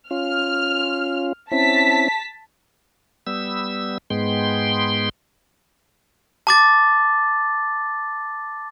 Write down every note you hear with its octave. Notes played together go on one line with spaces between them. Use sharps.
C#4 F4 F6
C4 C#4 E4 A5 B6
G3 B3 E6
G#2 G#3 B3 G5 C6
A5 D6 A6